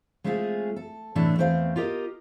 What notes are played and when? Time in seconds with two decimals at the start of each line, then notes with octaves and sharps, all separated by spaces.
0.24 G#3 A3 C4 E4 F4 G#4
0.76 A4
1.15 A2 C3 E3 A3 D4
1.38 E2 A3 C4 C5 E5 F5
1.76 F4 G4 A#4 D#5